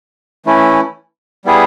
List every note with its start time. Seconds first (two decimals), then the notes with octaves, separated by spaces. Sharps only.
0.46 E3 A3 C#4 E4
1.45 G3 B3 E4 G#4